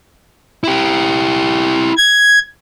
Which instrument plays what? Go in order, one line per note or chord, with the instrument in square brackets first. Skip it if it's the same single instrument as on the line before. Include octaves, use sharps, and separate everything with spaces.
[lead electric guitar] E4 G4
[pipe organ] G#6